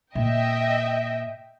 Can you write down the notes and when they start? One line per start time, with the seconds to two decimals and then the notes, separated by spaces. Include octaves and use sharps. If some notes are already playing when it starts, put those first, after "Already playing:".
0.15 A#2 D#5 E5 G5